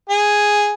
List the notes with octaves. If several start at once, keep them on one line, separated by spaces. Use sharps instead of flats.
G#4